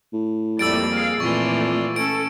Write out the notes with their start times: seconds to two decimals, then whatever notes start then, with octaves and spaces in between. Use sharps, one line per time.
0.13 A2
0.59 F2 G3 A3 A#3 D5 E6 A6 D7
0.91 G#4 F5
1.20 F2 A#2 E3 A3 F4 D5 C#6
1.96 C#4 A4 D7